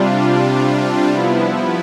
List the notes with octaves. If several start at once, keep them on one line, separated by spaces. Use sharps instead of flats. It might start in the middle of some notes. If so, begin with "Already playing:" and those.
Already playing: C3 G3 D4 F4
F3 B3 E4